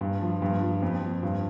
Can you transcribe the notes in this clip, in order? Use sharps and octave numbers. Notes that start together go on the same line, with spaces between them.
G2
F3
G2
F3
F2
F3
G2